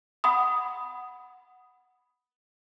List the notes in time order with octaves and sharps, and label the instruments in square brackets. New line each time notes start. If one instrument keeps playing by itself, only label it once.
[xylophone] F#5 B5 D#6